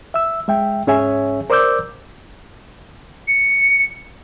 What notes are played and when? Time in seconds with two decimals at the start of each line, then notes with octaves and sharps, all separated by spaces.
0.14 E5 E6
0.48 G#3 E5 G5
0.87 G#2 C#4 G#4 C#5 E5 G#5
1.50 A#4 C5 D5 D6 E6 G6
3.28 C#7